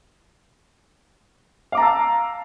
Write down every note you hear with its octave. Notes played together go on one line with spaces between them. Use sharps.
F5 A5 A#5 D6 E6